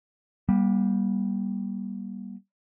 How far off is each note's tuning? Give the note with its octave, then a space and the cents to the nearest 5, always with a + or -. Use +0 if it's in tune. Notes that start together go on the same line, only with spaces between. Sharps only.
G3 +0 A#3 +45